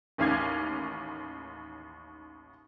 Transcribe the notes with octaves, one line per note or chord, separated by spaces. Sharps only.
A1 D#2 C#4 F5 D6 G#6